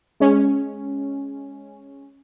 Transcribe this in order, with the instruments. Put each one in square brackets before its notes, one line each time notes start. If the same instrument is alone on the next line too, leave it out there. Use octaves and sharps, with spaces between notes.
[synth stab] G#3 C#4